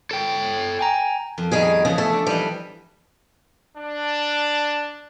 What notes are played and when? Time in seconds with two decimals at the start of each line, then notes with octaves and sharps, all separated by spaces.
0.11 A4 G5
0.79 G5 G#5 A#5
1.38 F2
1.52 D#3 G3 G#4
1.85 C#3 E3 F3 G#4
1.98 A3 A4
2.13 D4
2.27 E3 F3 G3 D#5
3.77 D4